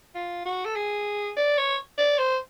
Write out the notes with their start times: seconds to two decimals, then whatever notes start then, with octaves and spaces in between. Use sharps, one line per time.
0.14 F4
0.45 F#4
0.65 A4
0.75 G#4
1.36 D5
1.58 C#5
1.98 D5
2.18 C5